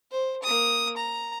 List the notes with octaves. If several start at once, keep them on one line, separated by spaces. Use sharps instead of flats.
C5
A#3 D#6
A#5